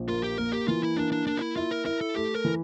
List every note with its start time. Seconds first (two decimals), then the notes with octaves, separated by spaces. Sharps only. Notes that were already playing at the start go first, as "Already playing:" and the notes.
Already playing: A#1
0.08 A#3 F4
0.23 G4
0.38 A#3 A#4
0.53 G4
0.68 E3 F4
0.83 E4
0.97 A#3 D4
1.12 D4
1.27 A#3 D4
1.37 F4
1.41 E4
1.56 E4 F4
1.71 A#4
1.85 E4 A#4
2.01 A4
2.15 A3 G4
2.35 A#4
2.45 E3